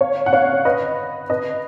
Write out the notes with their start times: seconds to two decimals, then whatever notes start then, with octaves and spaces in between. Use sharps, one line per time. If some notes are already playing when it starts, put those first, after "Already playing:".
0.01 C#5 F5
0.26 F#5
0.33 C#5 F5
0.65 B4 D#5
1.30 B4 D#5